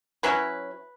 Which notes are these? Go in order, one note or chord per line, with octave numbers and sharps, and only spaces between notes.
F#3 C#4 E4 B4